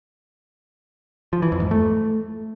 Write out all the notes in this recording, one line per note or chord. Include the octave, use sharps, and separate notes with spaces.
F3
E3
F2
G#2
A3